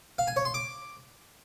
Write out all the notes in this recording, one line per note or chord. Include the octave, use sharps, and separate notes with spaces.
F5
G#5
C#5
C6
D6